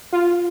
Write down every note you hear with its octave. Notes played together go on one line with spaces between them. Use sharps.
F4